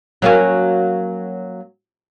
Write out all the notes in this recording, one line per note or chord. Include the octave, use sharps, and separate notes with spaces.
F#3 A#3 C#4